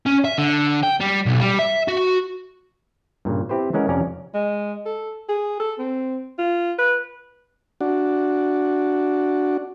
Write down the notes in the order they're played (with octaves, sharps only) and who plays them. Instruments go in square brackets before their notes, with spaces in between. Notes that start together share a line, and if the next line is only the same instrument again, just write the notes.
[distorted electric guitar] C#4
E5
D3
G5
G3
B1
G3
E5
F#4
[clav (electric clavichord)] G2 A#2 C#3
C4 E4 G4 B4 C5
E3 G#3 C#4 A#4 F#5
F2 C3 C#4 D5 A#5
[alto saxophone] G#3
A4
G#4
A4
C4
F4
B4
[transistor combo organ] D4 F#4